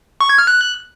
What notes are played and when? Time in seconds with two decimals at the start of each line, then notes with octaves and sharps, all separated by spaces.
0.21 C#6
0.29 G#6
0.38 F6
0.47 F#6